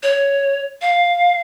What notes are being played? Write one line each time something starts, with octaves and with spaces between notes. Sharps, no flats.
C#5
F5